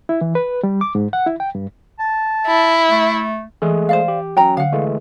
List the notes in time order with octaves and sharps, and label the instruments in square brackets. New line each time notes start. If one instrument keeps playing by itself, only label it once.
[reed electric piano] E4
E3
B4
G3
D6
G#2
F#5
E4
G5
G2
[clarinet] A5
[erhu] E4
[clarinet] A3
[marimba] E3 [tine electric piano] G#3 A3 G#4
[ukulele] C5 D5 F5
[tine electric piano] G4
[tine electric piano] F#3 C#4 [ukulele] G5 A#5
[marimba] D3 [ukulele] F5 F#5
[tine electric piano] E3 G#3 A3